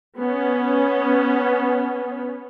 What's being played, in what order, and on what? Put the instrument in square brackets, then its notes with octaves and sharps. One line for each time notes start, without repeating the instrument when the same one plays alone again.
[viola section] B3 C#4